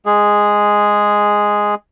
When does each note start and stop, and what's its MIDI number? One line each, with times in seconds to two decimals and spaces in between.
0.06 1.75 56
0.06 1.75 68